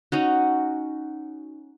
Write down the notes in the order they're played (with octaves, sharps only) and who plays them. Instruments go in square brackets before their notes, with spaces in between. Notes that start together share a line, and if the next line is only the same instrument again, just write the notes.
[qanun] C#4 D#4 F#4